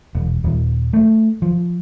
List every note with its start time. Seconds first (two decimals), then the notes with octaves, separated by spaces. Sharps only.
0.15 E1
0.44 D#1
0.93 A3
1.42 F3